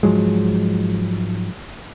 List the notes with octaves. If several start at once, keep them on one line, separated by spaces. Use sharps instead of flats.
G#2 F3 F#3 G#3